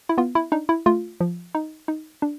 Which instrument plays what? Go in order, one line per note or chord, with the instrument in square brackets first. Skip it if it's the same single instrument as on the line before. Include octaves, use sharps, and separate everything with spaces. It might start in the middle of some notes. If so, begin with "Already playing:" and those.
[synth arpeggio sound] E4
B3 F4
E4
D4 D#4
E4
A3 F4
F3
D#4
D#4
D4